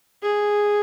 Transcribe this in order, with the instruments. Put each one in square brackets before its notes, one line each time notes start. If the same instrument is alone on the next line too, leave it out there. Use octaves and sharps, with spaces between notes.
[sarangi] G#4